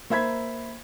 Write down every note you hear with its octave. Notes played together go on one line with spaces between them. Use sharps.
A#3 C5 E5 B5 G#6 B6